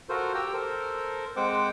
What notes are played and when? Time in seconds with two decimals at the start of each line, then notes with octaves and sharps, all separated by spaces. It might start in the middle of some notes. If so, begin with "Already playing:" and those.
0.09 F4 F#4 A4 A#4 C5
0.35 G4 G5 A#5 E6
0.53 A4 A#4 C5
1.37 G#3 C4 C5 F#5 G5 D6